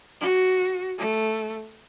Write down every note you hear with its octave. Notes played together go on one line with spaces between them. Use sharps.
F#4
A3